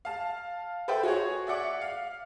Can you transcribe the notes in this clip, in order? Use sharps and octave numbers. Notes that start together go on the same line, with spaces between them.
F5 A5
A4 B4 C5 E5 G5
F#4 G#4 C#5
D5 E5 F#5 D6
F5